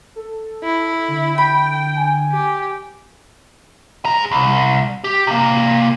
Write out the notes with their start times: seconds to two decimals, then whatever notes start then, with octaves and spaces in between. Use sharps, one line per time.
0.16 A4
0.64 E4
1.08 D3
1.38 G5 B5
1.97 G#5
2.32 G4
4.05 G#4 A#5
4.31 C2
5.04 G4
5.27 C3 A#3